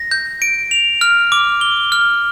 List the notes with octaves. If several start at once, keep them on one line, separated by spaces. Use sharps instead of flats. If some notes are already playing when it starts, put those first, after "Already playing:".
Already playing: A#6
G6
D7
F7
F6
D6
G7
F6